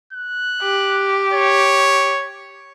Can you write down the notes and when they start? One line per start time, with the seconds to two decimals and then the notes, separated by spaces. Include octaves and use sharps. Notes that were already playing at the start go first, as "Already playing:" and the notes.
0.13 F#6
0.62 G4
1.33 C#5